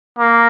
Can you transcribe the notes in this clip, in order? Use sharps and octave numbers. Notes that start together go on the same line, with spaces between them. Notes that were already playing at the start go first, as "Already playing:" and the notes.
A#3